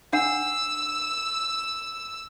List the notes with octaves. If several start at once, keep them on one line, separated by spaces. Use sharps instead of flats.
D4 F#5 E6